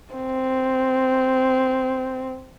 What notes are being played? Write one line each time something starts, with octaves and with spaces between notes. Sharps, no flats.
C4